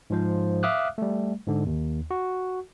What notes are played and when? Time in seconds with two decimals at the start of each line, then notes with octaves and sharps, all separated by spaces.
0.10 G#2 F3 C5
0.63 E5 F5 D6 D#6 F6 F#6
0.98 G3 A3
1.47 G#2 D3
1.66 D#2
2.11 F#4